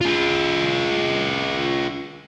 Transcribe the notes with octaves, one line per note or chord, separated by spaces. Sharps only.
F4 G#4